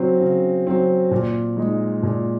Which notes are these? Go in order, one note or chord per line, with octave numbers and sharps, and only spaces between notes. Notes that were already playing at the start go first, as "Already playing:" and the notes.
Already playing: C#3 F#3 C4
C#3
F#3 C4
A#2
G#3 D#4
A#2